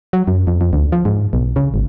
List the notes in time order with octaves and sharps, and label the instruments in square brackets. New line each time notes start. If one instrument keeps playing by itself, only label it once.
[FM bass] F#3
F#2
F2
F2
D2
F3
G#2
B1
C#3
G#1